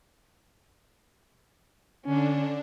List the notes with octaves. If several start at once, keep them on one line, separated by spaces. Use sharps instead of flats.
D3 C#4 D4